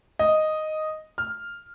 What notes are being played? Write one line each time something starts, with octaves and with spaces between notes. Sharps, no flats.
D#5
F6